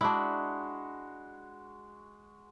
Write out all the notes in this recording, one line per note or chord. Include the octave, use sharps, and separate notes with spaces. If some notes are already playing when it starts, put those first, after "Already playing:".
G#3 D4 E4 F#4 B5